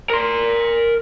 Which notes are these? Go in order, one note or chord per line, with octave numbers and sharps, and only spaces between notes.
A#4 C6